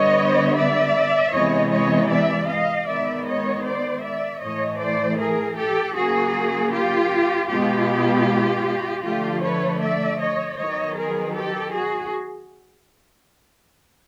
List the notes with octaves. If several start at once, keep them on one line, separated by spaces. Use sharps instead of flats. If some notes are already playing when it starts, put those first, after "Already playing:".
Already playing: D3 G3 B3 C#5 D#5
D5 E5
C3 E3 G#3 B3 C#5 D#5
C#5 D#5
D5 E5
D#5 F5
D#3 G#3 B3 D5 E5
C#5 D#5
C5 D5
D5 E5
A2 E3 A3 C#5 D#5
C5 D5
G#4 A#4
G4 A4
C#3 F#3 A#3 F#4 G#4
F4 G4
B2 G#3 B3 F4 G4
D3 F3 A3 F4 G4
B4 C#5
D5 E5
C#5 D#5
D#3 F#3 B3 C#5 D#5
G#4 A#4
G4 A4
F#4 G#4